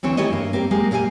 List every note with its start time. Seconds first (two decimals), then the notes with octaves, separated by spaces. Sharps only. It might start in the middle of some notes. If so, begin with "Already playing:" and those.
0.03 D2 E3 C4 C#5
0.17 D#3 A3 E4 G4 C#5 D#5
0.30 G2 A#3
0.53 A#3 C4 G4
0.71 G#3 A#3 G4
0.91 A#2 A#3 G4 D#5 G#5